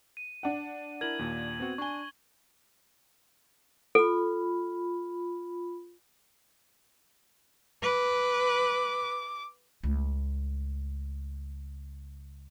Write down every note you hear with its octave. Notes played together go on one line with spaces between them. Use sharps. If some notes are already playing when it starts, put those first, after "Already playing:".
D#7
D4 F#5
E4 A#4 G#6 F#7
D#2 A#2
B3 C4 F#4
D4 G#5 C#6 G7
F4 A4 B5
B4 D6
C#2 A3